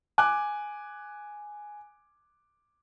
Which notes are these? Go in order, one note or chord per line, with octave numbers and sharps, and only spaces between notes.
G#5 D6 F#6